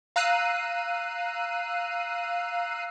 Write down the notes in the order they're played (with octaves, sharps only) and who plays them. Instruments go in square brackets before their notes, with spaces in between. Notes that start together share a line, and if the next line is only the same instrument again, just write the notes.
[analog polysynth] F5 A#5 E6 F#6 C7 D#7